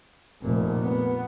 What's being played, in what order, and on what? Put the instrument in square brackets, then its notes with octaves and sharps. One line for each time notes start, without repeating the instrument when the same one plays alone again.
[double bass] F1 A#2
B3